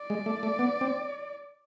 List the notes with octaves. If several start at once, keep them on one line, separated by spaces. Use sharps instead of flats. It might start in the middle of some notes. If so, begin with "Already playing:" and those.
Already playing: D5
G#3
A3
A3
B3
C4